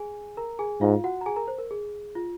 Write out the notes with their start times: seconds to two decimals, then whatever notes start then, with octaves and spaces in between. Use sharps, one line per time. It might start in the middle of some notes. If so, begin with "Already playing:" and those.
Already playing: G#4 G#5
0.37 A#4 A#5
0.59 G#4 G#5
0.81 G#2 F4 F5
1.04 F#4 F#5
1.21 A#5
1.26 G#4 G#5
1.36 A#4 A#5
1.48 C5
1.58 A#4
1.71 G#4
2.15 F4